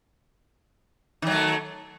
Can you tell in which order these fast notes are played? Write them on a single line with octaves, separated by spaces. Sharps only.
D#3 F#3 A3